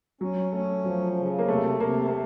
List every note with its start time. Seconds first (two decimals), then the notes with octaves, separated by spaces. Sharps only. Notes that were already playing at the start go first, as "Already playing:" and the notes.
0.21 F#3 C#4
0.53 A3 C#4
0.84 F3 F#3
1.17 C#3
1.39 A#3
1.48 C3 A3
1.80 C3 A#3
2.07 A#3